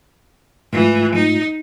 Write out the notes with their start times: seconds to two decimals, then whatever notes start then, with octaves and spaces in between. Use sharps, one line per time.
0.73 G#2 E3 A3 F4
1.16 D#4